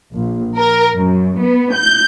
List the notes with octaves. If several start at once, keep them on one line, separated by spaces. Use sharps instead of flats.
A#1
A#4
F#2
B3
G6